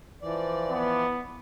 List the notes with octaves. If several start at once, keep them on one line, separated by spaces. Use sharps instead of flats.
E3 F3 D5
B3